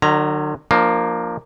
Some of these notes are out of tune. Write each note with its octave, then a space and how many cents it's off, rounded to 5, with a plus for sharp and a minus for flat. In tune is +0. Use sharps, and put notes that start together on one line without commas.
D3 +45 F#3 +0 A#5 +0
F3 +0 A#3 +0 D4 +40